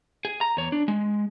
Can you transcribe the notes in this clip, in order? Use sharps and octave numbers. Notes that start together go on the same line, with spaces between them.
G#4
A#5
E2 C#5
D4
G#3